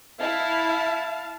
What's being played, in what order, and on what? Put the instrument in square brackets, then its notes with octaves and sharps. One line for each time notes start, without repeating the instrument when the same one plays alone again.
[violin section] E4 [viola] F5 A5